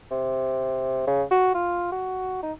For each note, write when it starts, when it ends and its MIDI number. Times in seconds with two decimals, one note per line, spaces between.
0.11 1.06 48
1.07 1.23 49
1.31 1.54 66
1.54 1.92 65
1.92 2.43 66
2.43 2.52 63